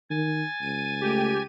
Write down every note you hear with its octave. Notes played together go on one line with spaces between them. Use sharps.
D#3 G#5 A6
C#2 D#7
A3 G4 D#7